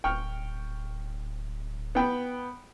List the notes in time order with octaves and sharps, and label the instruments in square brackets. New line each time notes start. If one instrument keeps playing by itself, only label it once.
[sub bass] D1 [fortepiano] G5 C#6 F6
[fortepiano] B3 G5 B5